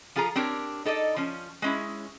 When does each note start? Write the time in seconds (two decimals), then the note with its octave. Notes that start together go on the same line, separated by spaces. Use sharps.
0.16 F3 F4 G#4 A4 A#5
0.35 C4 D4 G4 A#4 C#5
0.85 D#4 A4 D5 D#5
1.16 F3 C#4
1.62 G#3 C#4 E4